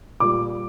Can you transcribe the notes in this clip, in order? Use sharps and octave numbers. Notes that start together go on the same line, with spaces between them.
A#2 G3 D6